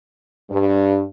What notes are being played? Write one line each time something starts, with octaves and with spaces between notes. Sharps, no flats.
G2